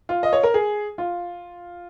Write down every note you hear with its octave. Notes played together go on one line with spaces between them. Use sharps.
F4
D#5
C#5
A#4
G#4
F4